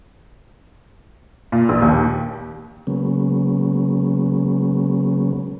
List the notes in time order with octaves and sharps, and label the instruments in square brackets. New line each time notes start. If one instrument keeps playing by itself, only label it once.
[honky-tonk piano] A#2
A#1
D#2
[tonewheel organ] C#3 F#3 G#3 A#3 B3 C#4